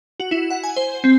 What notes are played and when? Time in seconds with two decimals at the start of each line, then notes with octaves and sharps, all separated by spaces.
0.20 F#4
0.31 E4
0.50 F#5
0.64 G#5
0.76 C5
1.04 C4